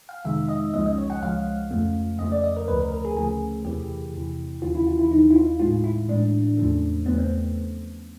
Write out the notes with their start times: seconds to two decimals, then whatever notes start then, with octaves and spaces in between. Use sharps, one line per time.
0.09 F5
0.25 F2 C3 D#3 G#3 E5
0.49 D#5
0.74 C#2 C#3 F3 G#3 D#5
0.86 D#5
0.98 C#5
1.10 F#5
1.22 C#2 C#3 F3 G#3 F5
1.71 F2 C#3 F3 A3
2.19 F2 C#3 F3 A3 D#5
2.32 D5
2.44 D#5
2.56 A#4
2.68 D2 C#3 F3 A3 B4
2.80 A#4
2.92 A#4
3.05 G#4
3.17 D2 C#3 F3 A3 G#4
3.65 E2 C3 E3 G4
4.14 E2 C3 E3
4.62 D#2 C#3 E3 F4
4.75 E4
4.87 F4
4.99 E4
5.11 D#2 C#3 E3 D#4
5.30 E4
5.36 F4
5.60 A2 E3 G#3 F4
5.84 E4
6.09 A2 E3 G#3 D4
6.57 E2 C#3 F3 A3
7.06 E2 C#3 F3 A3 B3
7.18 C4